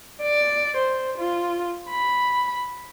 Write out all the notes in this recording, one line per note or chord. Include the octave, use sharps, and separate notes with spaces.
D5
C5
F4
B5